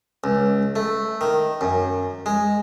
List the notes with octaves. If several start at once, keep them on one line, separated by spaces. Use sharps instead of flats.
C#2
A3
D#3
F#2
G#3